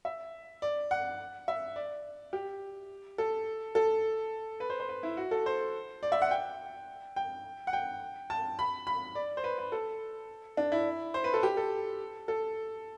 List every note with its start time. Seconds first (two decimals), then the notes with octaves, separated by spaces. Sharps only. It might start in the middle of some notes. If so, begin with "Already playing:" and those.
0.05 E5
0.62 D5
0.91 F#5
1.48 E5
1.76 D5
2.33 G4
3.18 A4
3.75 A4
4.60 B4
4.70 C5
4.80 C5
4.89 B4
5.03 E4
5.17 F#4
5.31 A4
5.46 C5
6.03 D5
6.12 E5
6.22 F#5
6.31 G5
7.16 G5
7.67 F#5
7.73 G5
8.30 A5
8.59 B5
8.87 B5
9.15 D5
9.37 C5
9.44 B4
9.58 B4
9.72 A4
10.57 D4
10.72 E4
11.14 C5
11.24 B4
11.34 A4
11.43 G4
11.57 A4
12.28 A4